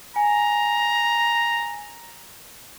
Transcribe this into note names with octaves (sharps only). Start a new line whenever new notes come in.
G#5 A#5